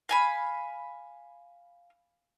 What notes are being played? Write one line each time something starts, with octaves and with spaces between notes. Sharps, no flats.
F5 G#5 B5